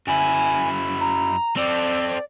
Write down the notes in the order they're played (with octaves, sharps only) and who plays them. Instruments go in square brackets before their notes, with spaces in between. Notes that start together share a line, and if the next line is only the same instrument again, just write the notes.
[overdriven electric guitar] F#2 E4 [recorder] G#5
[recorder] A#5
[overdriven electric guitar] C4 A4 [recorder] D5